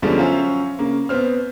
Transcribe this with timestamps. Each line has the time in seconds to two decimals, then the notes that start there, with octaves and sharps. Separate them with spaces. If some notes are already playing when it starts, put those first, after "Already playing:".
0.02 F#2 B2 D3 F3 G3 G#3
0.18 F#3 C#4 F4 C5 E5
0.79 C#3 A#3
1.09 B2 B3 C4 F6